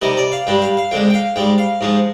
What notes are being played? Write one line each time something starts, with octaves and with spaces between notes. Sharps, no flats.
C3 D#3 G3 D#5
D5
F5
G2 D3 G3 G5
F5
F5
F2 D3 G#3 G5
G5
F5
G#2 G3 G5
F5
G#2 F3 G#3